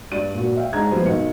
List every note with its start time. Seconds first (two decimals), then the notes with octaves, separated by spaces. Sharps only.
0.12 G2 D5 D#7
0.34 A#2 F#4
0.57 E5 F5 G5
0.72 G#2 D4 G#4 D5 A#5 G#6
0.91 F3 G3 B3 B4 C5
1.05 B1 D#3 C#7